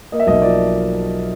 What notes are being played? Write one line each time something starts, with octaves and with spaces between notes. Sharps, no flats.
A#3 D#5
E5
B1 D#5
F3 D5